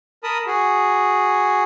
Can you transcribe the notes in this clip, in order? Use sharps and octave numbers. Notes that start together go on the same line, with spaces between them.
A#4 A5 B5 D#6
F#4 G#4